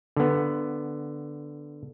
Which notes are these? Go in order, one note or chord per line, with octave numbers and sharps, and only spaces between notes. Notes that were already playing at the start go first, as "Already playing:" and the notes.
D3 B3